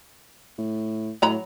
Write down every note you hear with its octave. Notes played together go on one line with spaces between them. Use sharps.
A2
A2 F#3 A#5 B5